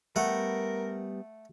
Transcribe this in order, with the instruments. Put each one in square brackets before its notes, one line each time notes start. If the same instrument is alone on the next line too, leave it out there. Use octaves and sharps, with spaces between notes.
[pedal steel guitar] G3 B3 G5 [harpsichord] A3 F#5 [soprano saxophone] A#4